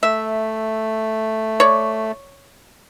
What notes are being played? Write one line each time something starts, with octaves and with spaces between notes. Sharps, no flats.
A3 E5
C#5 D5